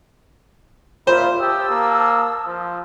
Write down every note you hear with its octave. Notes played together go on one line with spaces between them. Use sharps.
A#2 F4 C5 E5 B5
G4 A5 D#6 E6
A#3
F3